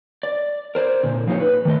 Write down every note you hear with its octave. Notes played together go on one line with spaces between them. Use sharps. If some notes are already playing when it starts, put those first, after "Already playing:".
D5
A#4 C5 D5
A#2 D3
F3 A#3 D#4 G4 C#5
B4
D#3 A3 D#5